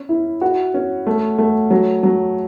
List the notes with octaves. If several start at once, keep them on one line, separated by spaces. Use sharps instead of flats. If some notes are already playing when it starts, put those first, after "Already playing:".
Already playing: C#4
E4
F#4
C#4
A3
A3
F#3
F#3